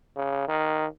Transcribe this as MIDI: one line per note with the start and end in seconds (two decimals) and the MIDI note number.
0.16 0.48 49
0.48 0.87 51